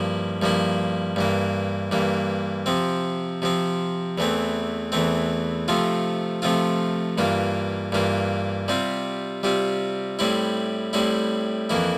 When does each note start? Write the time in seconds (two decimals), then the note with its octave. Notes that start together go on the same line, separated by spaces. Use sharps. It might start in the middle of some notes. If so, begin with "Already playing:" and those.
Already playing: G2 F3 A#3 E4
0.42 G2 F3 A#3 E4
1.16 G2 E3 A#3
1.91 G2 E3 A#3
2.66 C3 F3 C4
3.42 C3 F3 C4
4.18 E2 E3 A3 C4
4.92 E2 E3 A3 C4
5.68 C3 F3 A3 C4 F4
6.42 C3 F3 A3 C4 F4
7.18 G2 E3 A#3 F4
7.92 G2 E3 A#3 F4
8.68 C3 G3 C4 F4
9.43 C3 G3 C4 F4
10.19 A2 G3 C4 E4
10.93 A2 G3 C4 E4
11.70 F2 E3 A#3 E4